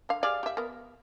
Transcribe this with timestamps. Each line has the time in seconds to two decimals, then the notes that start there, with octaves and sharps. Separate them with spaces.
0.09 D3 F5
0.23 G4 G#4 D5 F5
0.43 G4 E5
0.57 B3 A#4